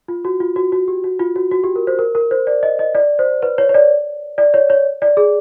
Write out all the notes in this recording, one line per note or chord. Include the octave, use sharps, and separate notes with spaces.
F4
F#4
F4
F#4
F#4
G4
F#4
F4
F#4
F#4
G4
A#4
C5
A#4
A#4
C5
D5
D#5
D#5
D5
C5
B4
C#5
C#5
D5
D5
C#5
C#5
D5
G#4